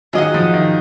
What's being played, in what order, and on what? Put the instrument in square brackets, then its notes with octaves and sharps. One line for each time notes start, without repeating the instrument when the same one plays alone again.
[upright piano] D#3 F#3 [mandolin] G#4 D#5 F#5
[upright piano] F3
D#3